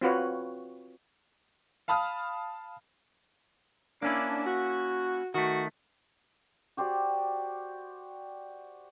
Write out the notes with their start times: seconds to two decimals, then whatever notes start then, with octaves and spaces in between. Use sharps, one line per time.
0.01 C4 F4 F#4 B4 C#5
1.88 F5 A5 B5 D#6 F6
4.02 A#3 C#4 D4 E4
4.46 F#4
5.34 D#3 A3 F#4
6.77 F#4 G4 C5 D5